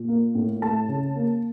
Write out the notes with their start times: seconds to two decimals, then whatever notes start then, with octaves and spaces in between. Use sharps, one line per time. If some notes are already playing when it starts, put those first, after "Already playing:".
Already playing: A#2
0.08 A#3
0.35 A2
0.62 A3 A5
0.88 C#3
1.16 A#3